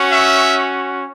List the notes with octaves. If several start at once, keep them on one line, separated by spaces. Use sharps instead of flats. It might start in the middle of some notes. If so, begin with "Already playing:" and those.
Already playing: C#4 F#4
E5